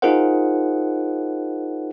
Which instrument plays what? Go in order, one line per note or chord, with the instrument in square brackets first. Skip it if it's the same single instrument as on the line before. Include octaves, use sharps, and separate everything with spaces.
[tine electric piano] D#4 F4 G#4 A#4 C5 F#5